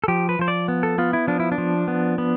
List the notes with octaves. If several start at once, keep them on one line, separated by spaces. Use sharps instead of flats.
A4
F3 G4
B4
F3 C5
D5
B3
A4
B3 F4
E4
F3 D4
E4
D4
F3
B3
B3